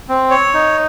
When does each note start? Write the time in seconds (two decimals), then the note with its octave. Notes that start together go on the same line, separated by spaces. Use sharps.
0.09 C4
0.30 C#5
0.54 D#4